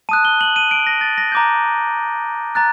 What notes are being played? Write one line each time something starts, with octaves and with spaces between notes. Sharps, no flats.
A5 D#6 F#6 D#7
G7
F#7
D#7
D7
A#6
A6
A#6
A#5 D6 G6
A#5 F#6 A6